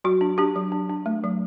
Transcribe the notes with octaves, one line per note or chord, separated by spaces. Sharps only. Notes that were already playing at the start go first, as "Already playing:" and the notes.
F#3 F#4
D4
D4 G4
F#3
D4
D4
A3
F#3